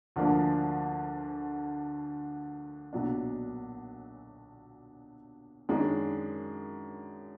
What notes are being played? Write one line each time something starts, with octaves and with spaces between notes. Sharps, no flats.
D2 D3 F3 A#3 D4
B1 A#2 F#3 D4
F#2 D#3 G#3 D4